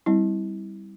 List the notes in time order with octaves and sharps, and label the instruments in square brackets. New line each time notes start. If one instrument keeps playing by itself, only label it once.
[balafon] G3 C4 E4